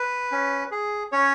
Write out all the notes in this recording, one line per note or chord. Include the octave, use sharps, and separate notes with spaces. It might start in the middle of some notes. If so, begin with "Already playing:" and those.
Already playing: B4
C#4
G#4
C#4 C#5